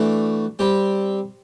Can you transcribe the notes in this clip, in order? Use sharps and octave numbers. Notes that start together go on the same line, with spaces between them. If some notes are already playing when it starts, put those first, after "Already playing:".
Already playing: E3 A3 D4 F#4
G3 C4 G4